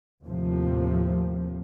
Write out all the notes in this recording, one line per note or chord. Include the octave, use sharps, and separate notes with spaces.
D#2 A2 C3 F3